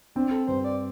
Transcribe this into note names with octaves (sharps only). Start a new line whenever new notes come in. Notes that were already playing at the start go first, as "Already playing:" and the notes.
C4 D4
A4
G2 C5
D5